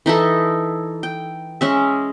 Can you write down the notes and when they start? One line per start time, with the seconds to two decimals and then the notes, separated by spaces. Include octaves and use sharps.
0.06 E3 D#4 E4 A4
1.03 G5
1.61 G#3 C#4 E5